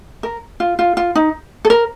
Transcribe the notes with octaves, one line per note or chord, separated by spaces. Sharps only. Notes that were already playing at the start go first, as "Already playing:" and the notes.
A#4
F4
F4
F4
D#4
A4
A#4